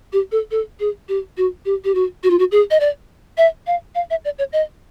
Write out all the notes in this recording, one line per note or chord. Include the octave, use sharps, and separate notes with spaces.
G4
A4
A4
G#4
G4
F#4
G4
G4
F#4
F#4
F4
F#4
G#4
D#5
D5
E5
F5
F5
E5
D5
C#5
D#5